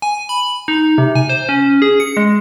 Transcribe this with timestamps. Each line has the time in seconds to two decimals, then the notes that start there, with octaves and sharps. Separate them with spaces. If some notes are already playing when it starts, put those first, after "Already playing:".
0.02 G#5
0.29 B5
0.68 D#4
0.98 C3
1.15 G#5
1.29 C5
1.49 C#4
1.82 G#4
2.00 C#7
2.17 G#3